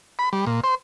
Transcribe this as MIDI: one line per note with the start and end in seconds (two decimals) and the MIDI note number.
0.19 0.29 83
0.33 0.45 55
0.46 0.60 46
0.64 0.75 72